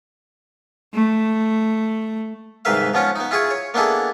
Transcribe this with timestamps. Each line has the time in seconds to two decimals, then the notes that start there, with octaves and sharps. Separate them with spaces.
0.94 A3
2.65 C2 G#2 D#3 B4 E5 F5
2.94 F3 B3 C#4 F4 F#5
3.16 B3 D#4
3.31 E4 F4 G#4 G#5 C#6
3.50 C#5
3.74 A#3 B3 D4 E4 G#4 A4